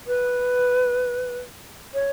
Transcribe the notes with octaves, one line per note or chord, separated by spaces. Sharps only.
B4
C#5